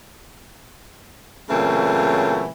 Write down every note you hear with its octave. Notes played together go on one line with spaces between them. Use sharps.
A#2 C#3 E3 F#3 A3 C4